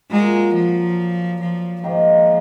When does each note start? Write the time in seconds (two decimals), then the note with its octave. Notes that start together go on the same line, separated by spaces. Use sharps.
0.11 A#2 F#3 G#3 A#3
0.55 F3
1.41 F3
1.84 G#2 D#3 F3 A#3 D#4